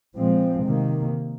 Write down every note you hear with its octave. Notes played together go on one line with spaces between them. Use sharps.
A#2 F3 G#3 C4
C3 D#3 A#3